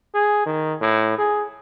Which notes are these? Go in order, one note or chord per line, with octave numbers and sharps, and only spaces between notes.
G#4
D#3
A2
G#4